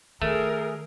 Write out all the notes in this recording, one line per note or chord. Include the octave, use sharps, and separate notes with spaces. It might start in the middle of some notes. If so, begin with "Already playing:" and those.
D#3 A3 G#4 A#4